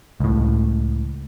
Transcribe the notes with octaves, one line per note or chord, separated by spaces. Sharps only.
C#2 A2